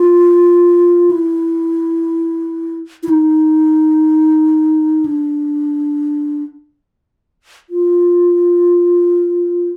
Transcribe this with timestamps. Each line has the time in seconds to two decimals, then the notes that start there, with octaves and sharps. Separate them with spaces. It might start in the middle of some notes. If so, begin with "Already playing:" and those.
Already playing: F4
1.11 E4
3.03 E4
3.09 D#4
5.06 D4
7.70 F4